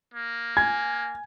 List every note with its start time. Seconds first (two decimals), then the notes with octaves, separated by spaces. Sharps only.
0.14 A#3
0.57 G#5 G#6